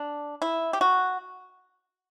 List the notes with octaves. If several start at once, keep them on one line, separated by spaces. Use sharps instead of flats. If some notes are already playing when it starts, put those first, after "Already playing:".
Already playing: D4
E4
G4
F#4